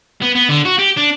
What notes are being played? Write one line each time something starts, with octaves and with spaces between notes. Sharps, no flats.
B3
B3
D3
F#4
G4
D4